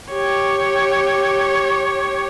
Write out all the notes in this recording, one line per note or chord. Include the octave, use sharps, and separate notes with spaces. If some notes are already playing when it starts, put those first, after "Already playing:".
G4 C#5